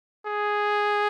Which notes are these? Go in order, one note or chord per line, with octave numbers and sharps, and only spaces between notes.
G#4